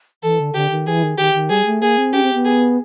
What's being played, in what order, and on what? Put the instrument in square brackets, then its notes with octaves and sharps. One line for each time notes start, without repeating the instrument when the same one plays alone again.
[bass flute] E3 [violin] A4
[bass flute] D3
[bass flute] D3 [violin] G4
[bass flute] D#3
[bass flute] E3 [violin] G#4
[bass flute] D#3
[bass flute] D#3 [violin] G4
[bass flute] D#3
[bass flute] G3 [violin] G#4
[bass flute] A3
[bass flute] A#3 [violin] G#4
[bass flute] C4
[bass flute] C#4 [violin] G4
[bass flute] C4
B3
[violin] G#4